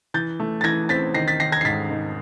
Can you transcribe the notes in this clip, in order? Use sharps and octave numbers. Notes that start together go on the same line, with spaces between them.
E3 G6 A6
A3
A6
E3 G#6 A#6
C4 A6 B6
D#3 A#6 C7
A6 B6
D#3 A#6 C7
G#6 A#6
C7
G#2 A6 B6
D#3